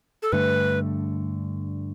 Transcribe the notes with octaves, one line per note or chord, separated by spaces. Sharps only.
A4
G2 D3 A3 B4